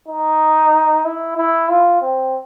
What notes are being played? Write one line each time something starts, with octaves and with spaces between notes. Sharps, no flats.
D#4
E4
E4
F4
C4